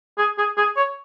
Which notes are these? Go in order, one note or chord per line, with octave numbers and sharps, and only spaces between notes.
G#4
G#4
G#4
C#5